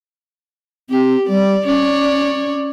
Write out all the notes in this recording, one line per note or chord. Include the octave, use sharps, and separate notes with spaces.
C4 G4
G3 D5
C#4 C#5 D5